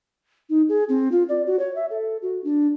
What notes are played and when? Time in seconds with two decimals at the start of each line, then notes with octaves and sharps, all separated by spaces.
0.50 D#4
0.69 G#4
0.89 C4
1.12 F4
1.29 D5
1.46 F#4
1.59 C#5
1.75 E5
1.90 A4
2.22 F#4
2.44 D4